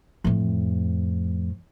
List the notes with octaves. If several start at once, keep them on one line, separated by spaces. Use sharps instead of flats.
F2 A2